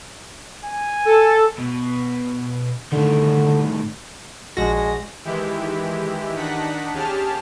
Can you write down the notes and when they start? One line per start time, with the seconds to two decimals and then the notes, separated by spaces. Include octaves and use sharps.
0.64 G#5
1.06 A4
1.58 B2
2.92 A2 D3 D#3
4.57 A#1 G#3 F#4 A#6
5.25 D#3 E3 G#3 E4 G4
6.36 D#3 D4 D#4 F#5 B6
6.92 D#2 C#4 G4 G#4 A5 F6